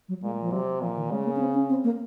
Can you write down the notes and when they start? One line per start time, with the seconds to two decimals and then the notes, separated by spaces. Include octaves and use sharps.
0.09 F#3
0.23 A#2 G#3
0.41 F3
0.52 C3 F#3
0.81 A#2 F3
0.97 D#3
1.11 C#3 G#3
1.25 A#3
1.36 C#4
1.40 C4
1.54 C#4
1.69 C4
1.84 A#3